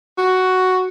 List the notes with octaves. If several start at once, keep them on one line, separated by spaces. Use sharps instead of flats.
F#4